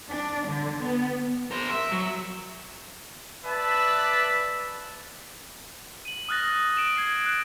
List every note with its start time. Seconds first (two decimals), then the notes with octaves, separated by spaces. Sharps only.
0.11 D4
0.47 D3
0.82 B3
1.51 A#4 C5
1.70 E5
1.92 F#3
3.45 B4 D5 E5 A5
6.05 D#7 F#7
6.29 D#6 F6 F#6 A6 A#6
6.77 D7 E7
6.96 G#6 C7 E7
7.26 F#6